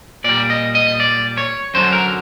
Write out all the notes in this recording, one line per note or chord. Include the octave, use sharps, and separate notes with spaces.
A#2 G3 D5
D#5
D#5
D5
C#5
F#2 D3 F#3 C5
A#4